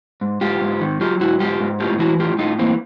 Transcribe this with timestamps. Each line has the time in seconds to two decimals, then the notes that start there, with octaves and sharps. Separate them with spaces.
0.21 G#2
0.41 G#2 F4 G4
0.61 G#2
0.81 D#3
1.01 F#3 F4 G4
1.20 G#2 E4 F#4
1.40 G#2 F4 G4
1.60 G#2
1.80 A2 F4 G4
1.99 E3 E4 F#4
2.19 A2 F4 G4
2.39 A2 D#4 F4
2.59 E3 A#3 C4